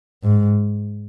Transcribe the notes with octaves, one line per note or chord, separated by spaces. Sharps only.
G#2